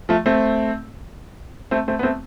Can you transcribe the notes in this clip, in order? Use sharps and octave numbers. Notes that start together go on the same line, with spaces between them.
F3 A3
A3 C4
A3 C4
A3 C4
B3
A3 C4